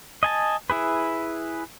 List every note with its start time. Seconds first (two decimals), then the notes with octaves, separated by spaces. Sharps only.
0.23 D#5 G#5 A5
0.70 E4 G#4 B4